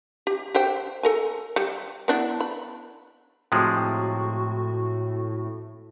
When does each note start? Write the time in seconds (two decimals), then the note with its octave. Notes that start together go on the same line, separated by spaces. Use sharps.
0.27 G4
0.55 G4 C5 G5
1.03 A4 A#4 G#5
1.56 G3
2.08 B3 D4 E4
2.40 B5
3.52 A2 C3 F3 G#3 F#4